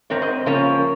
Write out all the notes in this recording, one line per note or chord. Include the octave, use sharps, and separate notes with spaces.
G#2 G3 C4 A#4 C#5
C5 D#5
C#3 F3 A#3 C#4 A#4 C#5